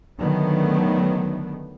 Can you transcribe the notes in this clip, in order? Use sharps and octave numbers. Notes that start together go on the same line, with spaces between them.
D3 D#3 F#3 A3 B3